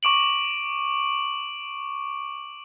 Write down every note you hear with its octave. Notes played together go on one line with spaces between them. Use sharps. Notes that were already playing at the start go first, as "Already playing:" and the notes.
C#6 D6 D7 F#7